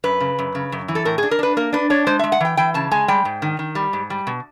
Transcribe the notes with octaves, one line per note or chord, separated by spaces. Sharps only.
F#2 B4
C#3
F#2
C#3
F#2
E3
A4
A2 A#4
G#4
D4
A#4
D4 B4
A#3 A#4
D4 B4
D4 C#5
G#3 C5
E5
G#3
F#5
E3 G5
E3 G5
C#3 A5
G#3 G#5
G3 G5
G#2
D#3
D#3
G3
G#2
G3
B2